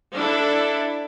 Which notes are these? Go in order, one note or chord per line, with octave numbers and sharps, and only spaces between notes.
D4 E4 A4